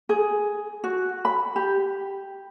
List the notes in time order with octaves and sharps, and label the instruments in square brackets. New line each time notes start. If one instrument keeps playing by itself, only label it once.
[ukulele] G#4
F#4
B5
G4